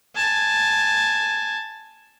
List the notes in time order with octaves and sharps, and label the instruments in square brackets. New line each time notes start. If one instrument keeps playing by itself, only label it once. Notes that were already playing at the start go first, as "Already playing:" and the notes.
[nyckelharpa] G#5 A5